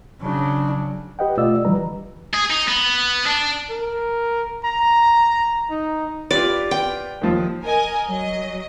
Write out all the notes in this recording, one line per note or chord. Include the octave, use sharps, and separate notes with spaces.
C#3 F#3 D4
G4 B4 D#5 F#5 G5
B2 A3 F4 D5 D#5 E6
D3 E3 F3 G3 B4 A#5
G#4
D#4
B3
D4
A#4
A#5
D#4
F4 G4 B4 D5
G5
D#2 F3
A#4 D#5 G#5
F#3 D#5